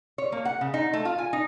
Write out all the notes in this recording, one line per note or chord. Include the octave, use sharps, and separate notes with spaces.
C#5
A#3
F#5
C#3
D#4
A3
F4
G#5
D#4